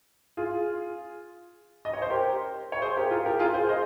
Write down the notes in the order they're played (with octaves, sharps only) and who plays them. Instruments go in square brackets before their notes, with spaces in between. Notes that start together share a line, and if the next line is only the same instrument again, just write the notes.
[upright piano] F4 G#4
D#5
C#5
C5
G4 A#4
C#5
G#4 C5
G4 A#4
F4 G#4
G4 A#4
F4 G#4
G#4 C5
C5 D#5